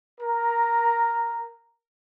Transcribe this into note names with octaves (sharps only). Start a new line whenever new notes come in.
A#4 A#5